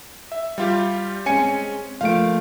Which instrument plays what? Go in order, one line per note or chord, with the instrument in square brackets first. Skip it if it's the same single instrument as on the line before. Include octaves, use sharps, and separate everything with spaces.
[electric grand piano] E5
G3 F4 G4
[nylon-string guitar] G#3 C4 [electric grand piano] C#4 G#5 C#7
[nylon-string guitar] F3 A3 A#3 [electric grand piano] F5 D7